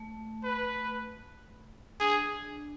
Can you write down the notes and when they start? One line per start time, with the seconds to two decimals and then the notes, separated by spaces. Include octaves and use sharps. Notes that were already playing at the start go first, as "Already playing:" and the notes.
Already playing: A3
0.44 B4
2.00 D4 G#4